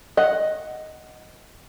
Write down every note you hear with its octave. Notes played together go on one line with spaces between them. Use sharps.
D#5 F#5